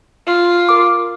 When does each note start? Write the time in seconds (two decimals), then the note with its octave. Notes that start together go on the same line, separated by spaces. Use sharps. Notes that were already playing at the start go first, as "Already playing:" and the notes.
0.27 F4
0.69 A#4 D6